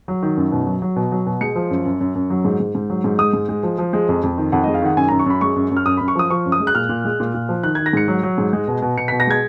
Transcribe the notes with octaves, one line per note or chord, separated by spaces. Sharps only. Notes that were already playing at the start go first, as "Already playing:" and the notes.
F#3
D#3
F#2
B2
F#3
F#3
B2
F#3
B2
G#3 C#7
F3
F#2
F#2
F#2
F#2
F#3
G#2
G#2
G#2
F#3
G#2
G#3 D#6
G#2
G#3
F3
F3
G#3
F2
F2
D#3
F2 F#5
G#3 D#5
F5
D#3 F#5
F#2 G#5
F#2 A#5
C#6
F#2 B5
G#3 C#6
F#2
F#2
F6
F#2 D#6
F#2 B5
C#6
F3 D#6
F3 C#6
F#2
D#6
G#3
F#6
A#2 F6
A#2
G#3
A#2
A#2
F3
D#3 F#6
D#3 G#6
A#6
G#2 C#7
F#3
F#3
G#2
G#3
B2
B2
B2 C#7
B2 B6
A#6
G#3 G#6